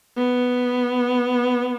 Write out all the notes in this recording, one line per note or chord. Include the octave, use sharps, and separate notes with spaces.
B3